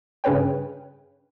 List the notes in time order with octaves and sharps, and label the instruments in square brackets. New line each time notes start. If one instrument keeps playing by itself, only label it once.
[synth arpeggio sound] G2 C#3 C#4 B4 C#5 G5